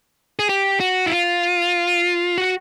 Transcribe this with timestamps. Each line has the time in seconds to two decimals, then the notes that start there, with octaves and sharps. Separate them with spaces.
0.39 G#4
0.49 G4
0.80 F#4
1.06 E4
1.12 F4
2.38 F#4